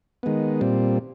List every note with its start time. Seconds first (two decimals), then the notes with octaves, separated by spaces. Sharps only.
0.23 D#3 G#3 B3
0.61 A#2 G3 C4